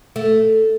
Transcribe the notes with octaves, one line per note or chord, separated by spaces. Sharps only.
A3